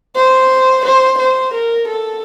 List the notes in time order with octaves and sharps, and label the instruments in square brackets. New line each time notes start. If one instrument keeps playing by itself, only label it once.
[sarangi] C5
C5
C5
A#4
A4